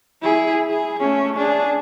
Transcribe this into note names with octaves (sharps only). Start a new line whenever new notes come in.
E4 G#4
G#4
A3 C#4
D4 G#4